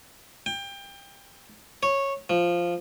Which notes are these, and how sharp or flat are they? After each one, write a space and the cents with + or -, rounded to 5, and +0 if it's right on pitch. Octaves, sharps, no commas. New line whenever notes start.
G5 +25
C#5 -10
F3 -5